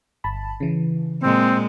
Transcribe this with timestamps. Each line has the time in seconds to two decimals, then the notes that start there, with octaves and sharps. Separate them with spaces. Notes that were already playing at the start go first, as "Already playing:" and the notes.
0.24 G1 A5 B5
0.60 C#3 E3
1.22 A#2 G#3 C4